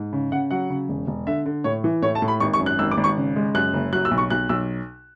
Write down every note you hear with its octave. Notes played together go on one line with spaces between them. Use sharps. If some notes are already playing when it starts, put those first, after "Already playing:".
Already playing: G#2
C#3
C#3 F#5
F#3 F#5
C#3
E1
E1
D3 E5
D3
A2 C#5
E3
A2 C#5
A5
A2
B5
G#1 C#6
C#6
F#2
F#6
G#1 E6
D6
G#1
C#6
C#3
G#3
F#2 F#6
F#1
F#3 F#6
E6
B1
C#6
B1 F#6
B1 E6